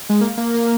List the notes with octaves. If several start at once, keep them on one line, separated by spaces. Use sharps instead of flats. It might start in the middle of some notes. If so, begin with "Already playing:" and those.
G#3
A#3
A#3
A#3